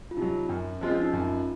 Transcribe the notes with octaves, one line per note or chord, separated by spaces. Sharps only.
F4
C3 F#3 D#4
F#2 C#4
F3 G#3 C4 F4
C#4
D#4
F#2 F4